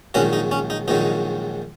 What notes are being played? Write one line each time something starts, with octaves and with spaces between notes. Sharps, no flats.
A#1 G#2 D#3 F#3 C#4 F#4
D#4
C#4
D#4
A#1 G#2 D#3 F#3 D#4